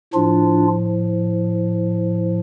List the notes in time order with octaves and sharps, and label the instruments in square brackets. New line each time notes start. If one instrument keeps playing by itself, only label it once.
[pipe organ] A2 F3 D4 F4